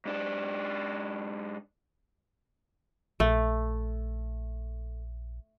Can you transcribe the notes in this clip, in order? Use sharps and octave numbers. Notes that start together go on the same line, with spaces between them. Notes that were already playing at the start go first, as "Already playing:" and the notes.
G#2 D4
A#1 A3